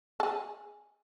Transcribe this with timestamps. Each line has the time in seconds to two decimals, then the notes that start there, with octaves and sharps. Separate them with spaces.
0.20 G#4 A4